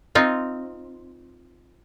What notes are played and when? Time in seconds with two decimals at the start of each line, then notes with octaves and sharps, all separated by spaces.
0.15 C4 D#4 F4